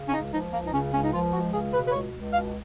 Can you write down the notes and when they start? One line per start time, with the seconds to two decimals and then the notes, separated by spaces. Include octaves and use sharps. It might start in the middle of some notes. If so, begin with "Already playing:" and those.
Already playing: C#3
0.09 C#4
0.14 C#2 D#4
0.33 F3 D#4
0.53 C#2 A#3
0.66 D#4
0.74 C#3 C#4
0.93 C#2 C#4
1.04 D#4
1.13 F3 F4
1.33 C#2 F#4
1.53 C#3 G#4
1.73 B2 B4
1.88 B4
1.92 C#2 C#5
2.12 C#2
2.33 B2 F5